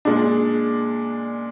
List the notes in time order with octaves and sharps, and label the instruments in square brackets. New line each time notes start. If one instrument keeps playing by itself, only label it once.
[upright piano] A#2 G#3 D4